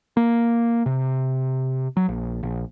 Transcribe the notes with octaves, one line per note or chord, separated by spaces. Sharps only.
A#3
C3
F#3
A#1
A#1